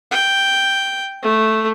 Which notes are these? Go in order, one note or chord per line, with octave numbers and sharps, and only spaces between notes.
G5
A3